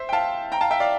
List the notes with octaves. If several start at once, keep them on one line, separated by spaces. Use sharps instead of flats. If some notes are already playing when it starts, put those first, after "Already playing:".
Already playing: C5 E5
G5
F5 A5
G5 A#5
F5 A5
E5 G5
D5 F5